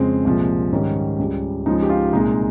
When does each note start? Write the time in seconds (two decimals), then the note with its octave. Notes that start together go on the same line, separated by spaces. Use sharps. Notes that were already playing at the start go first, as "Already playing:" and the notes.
Already playing: F2 C#3 G#3 C4
0.25 C2 A#2 F3 G#3
0.72 G#2 D#3 G3 C#4
1.19 C#2 C#3 G3
1.66 C#2 C#3 F3 G#3 D#4
1.82 G4
1.89 F4
2.13 C2 A#2 G#3 D#4